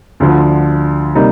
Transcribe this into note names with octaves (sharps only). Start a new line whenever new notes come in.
D2 D3 F3
C3 G3 A#3 D#4